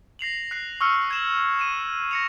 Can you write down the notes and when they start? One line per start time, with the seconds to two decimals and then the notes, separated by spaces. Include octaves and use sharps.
0.19 A#6 C7 F7 F#7
0.51 F#6 C7
0.81 C#6 E6 F6 C#7
1.11 G#6 E7 F#7
1.59 D#7 E7
2.11 A#6 C#7 F7